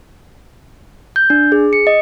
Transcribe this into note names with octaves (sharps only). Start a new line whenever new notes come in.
G6
D4
G#4
C#7
D#5